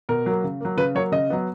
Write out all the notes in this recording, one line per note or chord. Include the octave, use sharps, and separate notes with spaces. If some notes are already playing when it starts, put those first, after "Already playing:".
B2 A#4
F#3 A#3
C#3
F#3 A#3
C#3 B4
F#3 A#3 C#5
C#3 D#5
F#3 B3